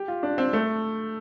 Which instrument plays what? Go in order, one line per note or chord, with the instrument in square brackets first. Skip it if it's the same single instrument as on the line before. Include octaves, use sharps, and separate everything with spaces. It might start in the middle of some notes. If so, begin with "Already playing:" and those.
Already playing: [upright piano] G4
F4
D4
C4
A3